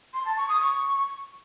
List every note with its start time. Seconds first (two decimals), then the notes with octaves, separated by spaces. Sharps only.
0.14 C6
0.25 A5
0.37 C#6
0.49 D#6
0.61 C#6